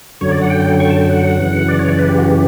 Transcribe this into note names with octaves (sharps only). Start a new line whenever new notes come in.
F#2 D3 F#3 C#5
D5
F#5
G5
C#6
A5
G5
F#5
F#2 C#3 E3
D5
C#5
D5
B4
G4
F#4
G4